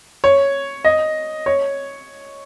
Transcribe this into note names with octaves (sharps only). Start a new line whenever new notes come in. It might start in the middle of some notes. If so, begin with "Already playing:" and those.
C#5
D#5
C#5